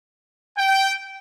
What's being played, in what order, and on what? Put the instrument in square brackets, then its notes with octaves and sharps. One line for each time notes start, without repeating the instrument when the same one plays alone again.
[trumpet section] G5